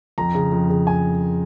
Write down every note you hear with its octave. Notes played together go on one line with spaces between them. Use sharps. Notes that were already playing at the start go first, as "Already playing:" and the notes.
F2 A#5
C#3
F2
C#3
G#5